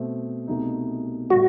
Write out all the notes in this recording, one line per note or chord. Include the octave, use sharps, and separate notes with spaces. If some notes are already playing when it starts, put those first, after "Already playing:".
Already playing: B2 A3 C4
C2 B2 A3 D#4
A2 G3 F#4